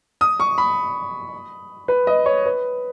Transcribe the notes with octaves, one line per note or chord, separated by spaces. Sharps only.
D#6
C#6
B5
B4
D#5
C#5
B4